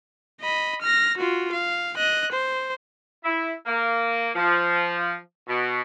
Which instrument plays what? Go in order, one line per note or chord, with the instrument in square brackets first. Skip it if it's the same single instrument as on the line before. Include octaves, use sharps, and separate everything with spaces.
[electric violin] D#5 B5
F6 A#6
F4 F#4
F5
D#5 F#6
C5
[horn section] E4
A#3
F3
B2